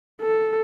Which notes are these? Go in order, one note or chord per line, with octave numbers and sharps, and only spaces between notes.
A4